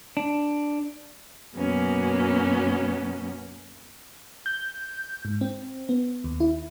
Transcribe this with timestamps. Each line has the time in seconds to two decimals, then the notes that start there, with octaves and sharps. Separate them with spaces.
0.17 D4
1.56 F#2 B2 F#3 A#3 B3 C#4
4.46 G6
5.25 G#2
5.41 C4
5.89 B3
6.24 D#2
6.40 E4